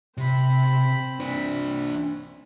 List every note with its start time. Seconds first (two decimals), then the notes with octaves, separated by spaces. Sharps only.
0.17 C3 C4 B5
1.20 D4 C5